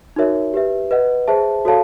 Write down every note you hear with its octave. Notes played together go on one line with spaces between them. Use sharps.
D#4 F#4 A#4 C#5 E5
G4 B4 E5
B4 D#5 F#5
G#4 C5 E5 A5
F#4 A4 C#5 F5 A5